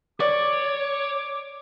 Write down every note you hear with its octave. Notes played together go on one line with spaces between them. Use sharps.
C#5 D5 D6